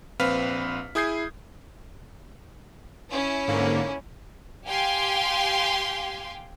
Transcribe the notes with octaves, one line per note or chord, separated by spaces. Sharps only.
A#1 C4 B4 F5 F6 B6
E4 G#4 D#6 G6 G#6 C7
C#4 E4
G#2 D3 A#3
G4 F5 G5 G#5 C6